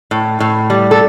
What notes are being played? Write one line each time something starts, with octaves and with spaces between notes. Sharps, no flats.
A2
A2
G3
A4